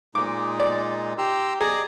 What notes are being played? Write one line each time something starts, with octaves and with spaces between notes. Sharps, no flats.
A#2 G#3 D#4 D6
D5
G4 A#5 C6 E6
G#4 D5 D#5 A#5 D6